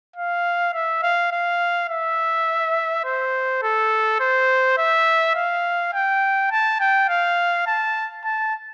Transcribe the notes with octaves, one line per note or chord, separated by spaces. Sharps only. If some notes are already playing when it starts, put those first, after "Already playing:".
F5
E5
F5
F5
E5
C5
A4
C5
E5
F5
G5
A5
G5
F5
A5
A5